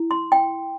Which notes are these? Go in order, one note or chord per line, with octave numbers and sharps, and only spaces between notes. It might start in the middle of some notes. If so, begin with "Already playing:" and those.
Already playing: E4
C6
G5